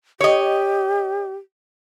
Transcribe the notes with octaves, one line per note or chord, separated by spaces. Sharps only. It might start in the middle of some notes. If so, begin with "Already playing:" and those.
G4 C#5 D#5